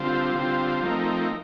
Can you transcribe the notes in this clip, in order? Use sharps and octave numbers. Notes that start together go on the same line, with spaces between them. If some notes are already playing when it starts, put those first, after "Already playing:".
Already playing: D3 G3 C4 F4 C5
D3 G3 C4 F4 C5
F3 A3 C4 D#4 A#4